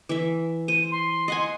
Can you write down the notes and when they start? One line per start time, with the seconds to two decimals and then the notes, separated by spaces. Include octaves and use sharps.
0.09 E3 E5
0.68 C5 D#7
0.91 C6
1.28 D#5 F#5 G#5